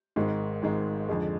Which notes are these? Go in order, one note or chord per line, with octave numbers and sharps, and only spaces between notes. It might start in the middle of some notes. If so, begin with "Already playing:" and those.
G#1 G#2 D#3 G#3
G#1 G#2 D#3 G#3
F2 D3 G#3